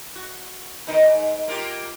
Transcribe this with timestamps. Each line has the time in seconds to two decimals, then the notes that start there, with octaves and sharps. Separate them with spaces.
0.16 F#4
0.87 B2 D#3 D#4
1.02 G#2
1.48 A#3 F4 G4